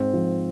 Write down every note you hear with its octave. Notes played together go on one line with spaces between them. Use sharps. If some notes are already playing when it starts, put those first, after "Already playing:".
Already playing: G#2 C4
F3